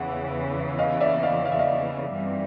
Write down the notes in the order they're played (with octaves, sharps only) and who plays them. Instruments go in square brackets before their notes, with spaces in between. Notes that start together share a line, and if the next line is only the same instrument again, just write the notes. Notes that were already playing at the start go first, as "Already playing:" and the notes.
Already playing: [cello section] E2 C#3 E3 [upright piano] F#5
[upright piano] D#5 F5
D5 E5
D#5 F5
F5
E5
D#5 F5
[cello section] G2 E3 G3 C4 D#4